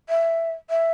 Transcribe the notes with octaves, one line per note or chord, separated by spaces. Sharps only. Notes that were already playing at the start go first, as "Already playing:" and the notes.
E5
E5